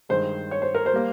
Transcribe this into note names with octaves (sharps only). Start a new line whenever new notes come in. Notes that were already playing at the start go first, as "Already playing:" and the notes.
G2 D#3 G#3 C5
C#5
C5
A#4
C5
G3 A#3